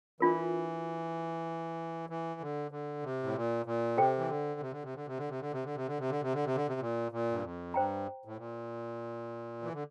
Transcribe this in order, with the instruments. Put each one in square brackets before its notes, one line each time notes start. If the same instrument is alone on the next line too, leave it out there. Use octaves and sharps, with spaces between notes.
[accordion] E3 [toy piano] D4 F4 A#4
[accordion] E3
D3
D3
C3
A2
A#2
A#2
[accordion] C3 [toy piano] A4 C5 G5
[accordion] E3
D3
C3
D3
C3
D3
C3
D3
C3
D3
C3
D3
C3
D3
C3
D3
C3
D3
C3
D3
C3
A#2
A#2
G2
F2
[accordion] G2 [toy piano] C5 G5 A#5
[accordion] A2
A#2
E3
D3